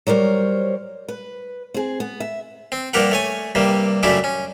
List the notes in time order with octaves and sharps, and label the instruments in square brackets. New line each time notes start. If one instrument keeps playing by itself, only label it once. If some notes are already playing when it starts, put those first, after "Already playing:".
[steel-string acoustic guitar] F#3 G3 A#4 C5 C#5
B4
C4 G#4
B3
E5
[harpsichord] C4
G2 F3 A#3 G4 A#4 F#5
A3 C#5 G#5
G2 C3 G3 A#3
F#2 C#3 G3 A3 D4 E4
C#4